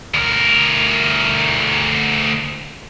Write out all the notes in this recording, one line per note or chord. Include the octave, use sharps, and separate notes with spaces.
D2 A#4